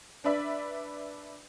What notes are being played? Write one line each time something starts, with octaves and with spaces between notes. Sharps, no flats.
D4 B4 D5 E5